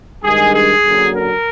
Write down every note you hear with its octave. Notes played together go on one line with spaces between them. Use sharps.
G2 D#3 G#3 G#4
G#4
F#2 D3 F#3 A#3
A#4